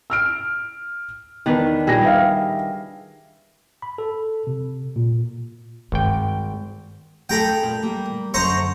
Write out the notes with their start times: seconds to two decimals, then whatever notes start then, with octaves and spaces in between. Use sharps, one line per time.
0.10 E6 F6 D7
1.46 E2 D#3 D4 B4
1.87 A#1 G3 G#4 A#6
2.03 B4 E5 F5
3.82 B5
3.98 A4
4.47 C3
4.96 A#2
5.92 G#1 G2 G5
7.29 A3 G#4 A4 G5 A#5 B5
7.63 A#2
7.82 G3 A#3
8.34 F#2 D3 C5 A#5 C#6